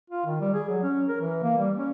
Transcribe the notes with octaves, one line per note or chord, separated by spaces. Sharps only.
F4
D#3
G3
G#4
F#3
C#4
A#4
E3
A#3
G3
C#4